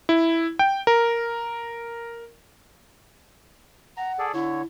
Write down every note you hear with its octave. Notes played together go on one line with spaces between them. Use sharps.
E4
G5
A#4
F#5 A#5
G#4 A4 D5
D3 E4 C#5